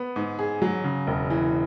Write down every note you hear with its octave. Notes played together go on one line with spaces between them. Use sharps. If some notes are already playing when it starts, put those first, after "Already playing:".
Already playing: B3
G#2
G#4
F#3
C#3
E1
E3